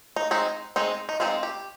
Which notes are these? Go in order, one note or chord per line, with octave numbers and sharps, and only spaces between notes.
D#4
G#3 C4 D#4
G#3 C4 D#4
D#4
G#3 C4 D#4 F4
G4